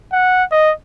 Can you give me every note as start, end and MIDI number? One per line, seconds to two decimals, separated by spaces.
0.12 0.44 78
0.52 0.72 75